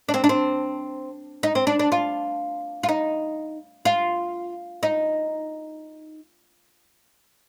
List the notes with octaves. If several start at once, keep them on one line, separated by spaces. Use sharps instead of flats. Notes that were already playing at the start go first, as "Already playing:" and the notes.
D4
C4
D4
C4
D#4
C4
D4
D4
F4
F4
D#4
F4
D#4